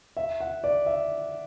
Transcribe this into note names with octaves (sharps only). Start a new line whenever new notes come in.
E5
F#5
D5
E5